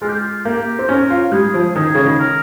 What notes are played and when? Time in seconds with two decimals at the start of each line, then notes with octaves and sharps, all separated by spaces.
0.02 G#3 F4
0.08 G4
0.16 F4
0.45 A#3 G4
0.79 C4
0.88 C#4 A#4
1.10 F4
1.32 G3 G#4
1.54 F3
1.75 D#3 G#4
1.95 C#3
2.05 D#3
2.19 A#4